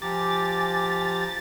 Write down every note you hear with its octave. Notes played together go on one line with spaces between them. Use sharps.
F3 G4 G#5 A#5 D6 A6